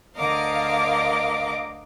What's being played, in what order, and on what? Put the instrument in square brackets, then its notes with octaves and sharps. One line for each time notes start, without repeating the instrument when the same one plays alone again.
[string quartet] D2 D3 A#4 D#5 F5 D6